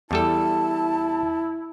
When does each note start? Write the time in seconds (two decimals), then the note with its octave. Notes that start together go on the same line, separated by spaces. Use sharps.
0.11 E2 G3 E4 A4 A5